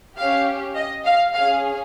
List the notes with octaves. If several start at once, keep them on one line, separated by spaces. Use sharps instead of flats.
C#4 G4 F5
D#5
F5
C#4 G#4 F5